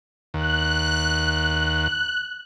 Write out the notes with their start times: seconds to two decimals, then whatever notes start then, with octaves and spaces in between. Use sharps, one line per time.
0.34 D#2 F#6